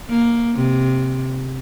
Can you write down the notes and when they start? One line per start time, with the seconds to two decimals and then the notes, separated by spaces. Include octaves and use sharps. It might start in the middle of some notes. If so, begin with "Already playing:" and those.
0.09 A#3
0.55 C3